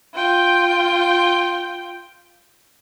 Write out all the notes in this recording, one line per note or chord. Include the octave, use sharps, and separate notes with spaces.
F4 G5